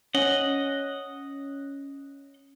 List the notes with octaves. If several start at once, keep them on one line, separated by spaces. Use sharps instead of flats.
C#4 D#5 F#5